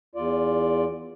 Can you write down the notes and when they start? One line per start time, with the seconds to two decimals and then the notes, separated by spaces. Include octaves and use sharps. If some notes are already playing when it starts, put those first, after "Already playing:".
0.15 E2 F4 D5